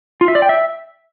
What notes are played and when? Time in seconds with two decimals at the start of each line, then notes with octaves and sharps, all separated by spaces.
0.21 F4
0.28 E5
0.35 D5
0.42 G5
0.49 E5